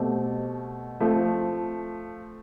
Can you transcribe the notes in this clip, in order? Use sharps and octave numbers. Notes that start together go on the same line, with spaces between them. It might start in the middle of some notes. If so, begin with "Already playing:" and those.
Already playing: B2 A3 C4 G4
F3 A3 C4